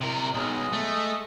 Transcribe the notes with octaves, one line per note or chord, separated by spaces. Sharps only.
C3 A#4
B1 G#3 D#5 D#6
A3